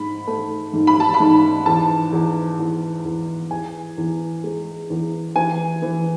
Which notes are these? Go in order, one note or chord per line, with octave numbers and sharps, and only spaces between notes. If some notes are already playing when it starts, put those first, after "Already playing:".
Already playing: G#2 B5
A3
G#2
B5
A5
B5
G#2
E2 A5
E2
E2
E2
E2 G#5
E2
G#3
E2
E3 G#5
E3